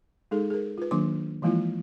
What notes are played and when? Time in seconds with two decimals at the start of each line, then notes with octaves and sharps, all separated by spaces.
0.31 G#3 D#4 G#4 A4
0.50 G#4 A#4
0.78 F4 B4
0.91 D#3 F#3 A#3 D4 D6
1.42 E3 F3 G#3 A#3 E4 F4